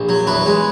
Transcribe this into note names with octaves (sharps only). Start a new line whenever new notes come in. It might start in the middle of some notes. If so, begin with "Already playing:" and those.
Already playing: A#1
F#3
E2 B4
G#3